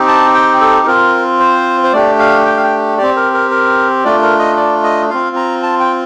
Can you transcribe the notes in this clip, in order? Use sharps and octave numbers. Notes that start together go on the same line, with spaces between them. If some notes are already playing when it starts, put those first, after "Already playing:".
Already playing: C4 D#4 G4
A5
G5
A4
C4 F4 A#4
C5
C5
A3 D4 G4 D5
F5
G5
F5
G5
C4 G4 D5
A#4
A#4
A#4
A3 D4 F4 D5
A#4
D#5
D5
D#5
C4 F4 F5
A#5
A5
G5